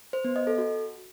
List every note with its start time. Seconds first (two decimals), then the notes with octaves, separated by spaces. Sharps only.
0.13 C5
0.24 B3
0.36 D#5
0.47 A4
0.58 F#4